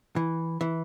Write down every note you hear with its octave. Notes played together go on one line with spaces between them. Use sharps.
E3
E3